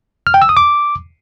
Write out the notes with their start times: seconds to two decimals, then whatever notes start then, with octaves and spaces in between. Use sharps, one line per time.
0.27 F6
0.34 G5
0.42 E6
0.49 D#6
0.57 D6